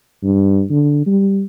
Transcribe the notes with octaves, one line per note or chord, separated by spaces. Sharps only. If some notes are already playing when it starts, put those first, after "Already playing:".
G2
D3
G3